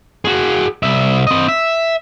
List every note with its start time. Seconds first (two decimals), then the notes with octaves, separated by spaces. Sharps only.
0.25 F#4 G#4
0.83 C2 E5
1.27 C4 D#5
1.48 E5